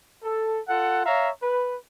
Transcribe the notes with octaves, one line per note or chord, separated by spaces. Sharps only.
A4
F4 A4 F#5
C#5 E5 F5 A#5
B4